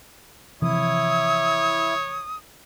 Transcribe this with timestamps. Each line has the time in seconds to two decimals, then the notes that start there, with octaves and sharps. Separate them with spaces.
0.62 C3 E3 F3 E4 C#5 D#6